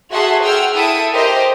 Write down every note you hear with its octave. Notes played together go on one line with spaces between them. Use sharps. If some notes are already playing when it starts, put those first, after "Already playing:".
F#4 G#4 A4 E5 F#5 C6
G#4 F#5 G5 E6 F6
E4 A4 E5 D#6 D7
G4 A#4 C5 D#5